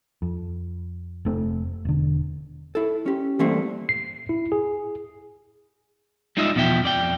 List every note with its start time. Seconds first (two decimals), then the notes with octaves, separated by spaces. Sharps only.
0.22 F2
1.25 F1 A3 C4
1.85 E1 D3
2.75 E4 A4
3.06 C#4 G4
3.39 E3 G3 A3 A#3 C4
3.89 C7
4.29 E4
4.52 G#4
6.37 G3 G#3 D#4 F4 D#5 E5
6.56 E2 B2 F3 E5 G5
6.84 F2 D5 G5